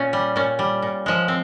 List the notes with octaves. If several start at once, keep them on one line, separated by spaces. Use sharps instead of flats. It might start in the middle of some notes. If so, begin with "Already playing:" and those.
Already playing: A#2 C#4
G3
A#2 C#4
G3
A#2
F3 G#3
C4